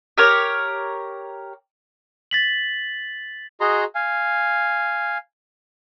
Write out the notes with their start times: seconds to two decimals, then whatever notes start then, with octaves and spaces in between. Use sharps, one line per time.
0.18 G4 A#4 C#5
2.31 A6 B6 F#7
3.61 F#4 G#4 D#5 A#5 C6
3.95 F5 G#5